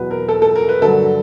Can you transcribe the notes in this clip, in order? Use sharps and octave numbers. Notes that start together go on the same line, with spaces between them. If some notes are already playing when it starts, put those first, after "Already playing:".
Already playing: E2 B2 F#3 B4
A#4
A4
A4
A#4
B4
G2 D3 F#3 A4